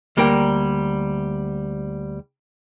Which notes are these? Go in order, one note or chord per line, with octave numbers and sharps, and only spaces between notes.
D2 G3 A#3 A#4 G5